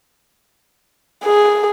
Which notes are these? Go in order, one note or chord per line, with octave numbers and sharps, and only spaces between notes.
G#4